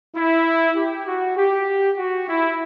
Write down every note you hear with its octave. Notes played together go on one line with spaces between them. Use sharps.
E4
G4
F#4
G4
F#4
E4